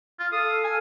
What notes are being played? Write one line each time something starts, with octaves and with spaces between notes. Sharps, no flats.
F4
A4 F5 D#6
G#5